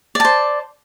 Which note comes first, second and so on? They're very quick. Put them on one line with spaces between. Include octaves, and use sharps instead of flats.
D5 A5 C5